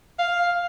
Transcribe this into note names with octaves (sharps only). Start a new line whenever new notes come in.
F5